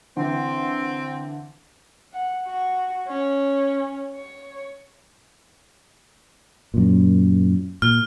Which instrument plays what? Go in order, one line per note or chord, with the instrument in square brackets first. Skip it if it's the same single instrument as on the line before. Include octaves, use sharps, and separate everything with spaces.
[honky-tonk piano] D3 E3 [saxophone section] C4
[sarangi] F#5
F#4
C#4
C#5
[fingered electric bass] F#2 A#2
[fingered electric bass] A#2 [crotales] F6